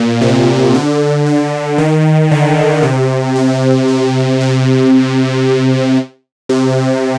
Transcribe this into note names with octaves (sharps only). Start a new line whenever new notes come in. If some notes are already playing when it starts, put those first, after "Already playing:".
Already playing: A#2
C3
D3
D3
D#3
D3
C3
C3
C3
C3
C3